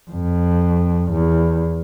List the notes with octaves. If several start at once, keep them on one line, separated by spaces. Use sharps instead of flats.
F2
E2